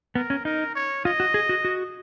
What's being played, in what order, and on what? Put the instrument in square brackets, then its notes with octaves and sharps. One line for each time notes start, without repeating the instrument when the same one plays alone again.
[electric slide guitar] B3 [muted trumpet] A#4
[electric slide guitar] C#4
[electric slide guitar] D#4 [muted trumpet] A#4
[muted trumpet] C#5
[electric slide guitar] F4 [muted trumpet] D#5
[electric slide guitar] F#4
G#4
F#4
F#4